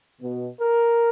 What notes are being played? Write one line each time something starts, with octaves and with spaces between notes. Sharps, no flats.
B2
A#4